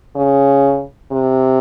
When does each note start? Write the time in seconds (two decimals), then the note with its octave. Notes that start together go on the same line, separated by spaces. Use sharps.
0.16 C#3
1.12 C3